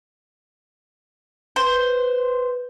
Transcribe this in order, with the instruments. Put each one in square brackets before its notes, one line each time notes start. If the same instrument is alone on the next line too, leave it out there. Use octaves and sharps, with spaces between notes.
[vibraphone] B4 [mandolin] C5